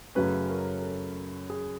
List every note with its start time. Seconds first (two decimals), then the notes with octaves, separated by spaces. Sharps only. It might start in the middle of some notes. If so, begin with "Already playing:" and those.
0.15 F#2 C#3 F#3 A3 C#4 B4
0.49 A#4
0.82 A4
1.50 G#4